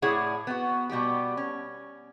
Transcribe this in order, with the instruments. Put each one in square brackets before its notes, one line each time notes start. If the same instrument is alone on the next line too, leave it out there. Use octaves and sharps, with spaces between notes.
[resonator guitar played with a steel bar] A2 E4 G#4 C#5 D5 F#5
B3 F#4
B2 G3 B3 G4
C#4